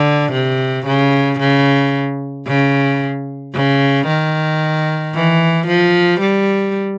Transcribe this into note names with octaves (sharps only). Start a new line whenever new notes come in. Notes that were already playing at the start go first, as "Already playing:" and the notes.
Already playing: D3
C3
C#3
C#3
C#3
C#3
D#3
E3
F3
G3